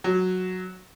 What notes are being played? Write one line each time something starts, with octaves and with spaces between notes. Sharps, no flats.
F#3